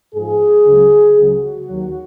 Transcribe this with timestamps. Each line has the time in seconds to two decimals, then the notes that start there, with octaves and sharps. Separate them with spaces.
0.15 G#2 F3 G#4
0.66 C#2 C#3 F#3
1.16 C#2 C#3 F#3 F#4
1.67 D#2 D#3 F#3